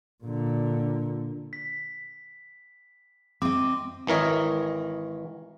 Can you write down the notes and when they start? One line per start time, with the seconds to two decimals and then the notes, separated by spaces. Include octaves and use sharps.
0.24 A#2 D3
1.53 B6
3.42 C4 D#5 D6
4.07 G#1 E3 A#4 C#5 D#5